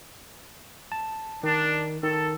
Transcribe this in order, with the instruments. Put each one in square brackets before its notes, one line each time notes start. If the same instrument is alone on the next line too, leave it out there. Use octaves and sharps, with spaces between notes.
[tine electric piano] A5
[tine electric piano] D#3 [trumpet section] D4
[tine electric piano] D#3 [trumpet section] A4